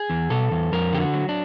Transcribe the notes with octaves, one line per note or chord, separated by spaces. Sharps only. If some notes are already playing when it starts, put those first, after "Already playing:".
Already playing: G#4
E2
B2 A4
E2
F2 A#4
D3 G4
F#4
F#3
D4